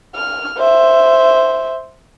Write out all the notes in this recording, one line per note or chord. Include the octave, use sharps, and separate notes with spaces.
F6
C5 E5